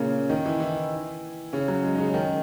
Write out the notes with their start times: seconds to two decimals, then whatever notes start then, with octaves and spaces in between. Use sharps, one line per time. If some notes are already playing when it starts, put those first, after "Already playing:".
Already playing: A#2 C#3 A#3 C#4
0.29 D#3 D#4
0.45 E3 E4
0.60 E3 E4
1.53 C#3 C#4
1.68 F#3
1.83 G#3
1.95 D#4
1.98 C#3 C#4
2.09 C#4
2.14 D#3 D#4